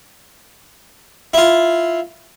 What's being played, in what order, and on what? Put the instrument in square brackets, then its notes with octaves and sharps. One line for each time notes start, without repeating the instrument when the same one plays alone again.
[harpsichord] E4 F4